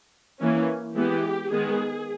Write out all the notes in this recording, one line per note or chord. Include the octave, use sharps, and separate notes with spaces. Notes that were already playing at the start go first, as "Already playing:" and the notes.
E3 A#3 C#4
E3 G#3 B3 G4
D#3 G#3 B3 G#4